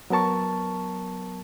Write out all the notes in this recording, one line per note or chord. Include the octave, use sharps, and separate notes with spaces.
F#3 B3 A#4 A5 C#6